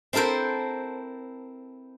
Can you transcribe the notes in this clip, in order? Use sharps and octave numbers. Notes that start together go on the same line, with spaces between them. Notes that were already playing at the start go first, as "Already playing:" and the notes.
C4 E4 A4 A#4 C5